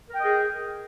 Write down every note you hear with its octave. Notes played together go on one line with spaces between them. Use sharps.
G#4 A#4 D#5 G5